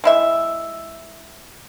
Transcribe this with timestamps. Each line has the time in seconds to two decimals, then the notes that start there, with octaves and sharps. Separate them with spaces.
0.04 G#3 E4 E5